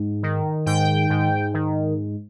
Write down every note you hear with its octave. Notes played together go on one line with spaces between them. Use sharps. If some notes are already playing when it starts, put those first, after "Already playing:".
Already playing: G#2
D#3
G#2 G5
G#2
D#3